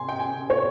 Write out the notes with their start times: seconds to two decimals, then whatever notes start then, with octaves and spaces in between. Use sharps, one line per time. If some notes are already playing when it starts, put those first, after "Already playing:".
Already playing: C3 G#5 C6
0.09 G5
0.20 G#5
0.50 C#5